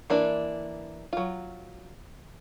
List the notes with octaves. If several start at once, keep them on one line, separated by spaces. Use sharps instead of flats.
E3 A#3 D4
F#3 F4